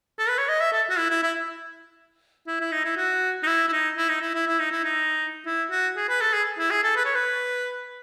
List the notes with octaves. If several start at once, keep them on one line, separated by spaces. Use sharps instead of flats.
A4
B4
C#5
D#5
E5
A4
F#4
E4
E4
E4
E4
E4
D#4
E4
F#4
D#4
E4
E4
D#4
E4
D#4
E4
E4
E4
D#4
E4
D#4
E4
F#4
G#4
B4
A4
G#4
E4
G#4
A4
B4
C#5
B4